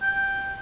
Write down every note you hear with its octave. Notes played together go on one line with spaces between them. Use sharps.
G5